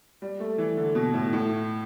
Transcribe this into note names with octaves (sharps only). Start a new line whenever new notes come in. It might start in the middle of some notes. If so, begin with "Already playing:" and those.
G3
A3
E3
D3
B2
A2
A2